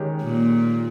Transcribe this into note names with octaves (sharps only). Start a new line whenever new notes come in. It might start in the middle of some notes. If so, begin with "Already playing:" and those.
Already playing: D#3 G#3 C#4 G4
A#2